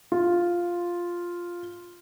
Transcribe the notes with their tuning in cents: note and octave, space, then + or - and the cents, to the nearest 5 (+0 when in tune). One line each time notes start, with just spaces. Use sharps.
F4 +0